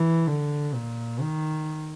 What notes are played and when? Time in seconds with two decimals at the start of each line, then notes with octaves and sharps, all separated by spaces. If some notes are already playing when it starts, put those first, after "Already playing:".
Already playing: E3
0.28 D3
0.75 A#2
1.22 D#3